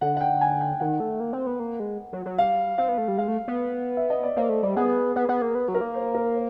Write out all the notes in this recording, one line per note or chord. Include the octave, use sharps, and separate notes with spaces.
D3 F#5
F#5
G5
G#5
G5
D#3 F#5
A3
A#3
C4
B3
A#3
G#3
F#3
F#3
G3 F5
C4 F5
B3
A3
G3
G#3 F5
A3
B3
E5
D#5
D5
A#3 C5
A3
G3
B3 G#4
B3
B3
A#3
B3
F#3
A#4
A#3
C5
A#4
C5